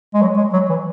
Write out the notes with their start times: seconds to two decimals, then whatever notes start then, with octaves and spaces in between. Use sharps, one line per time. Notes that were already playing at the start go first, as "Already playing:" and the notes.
0.14 G#3
0.22 F#3
0.37 G#3
0.54 F#3
0.70 E3